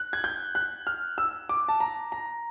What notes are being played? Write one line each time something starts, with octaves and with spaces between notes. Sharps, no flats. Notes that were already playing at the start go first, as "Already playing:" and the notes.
Already playing: F#6
G#6
G6
F#6
F6
E6
D6
A5
A#5
A#5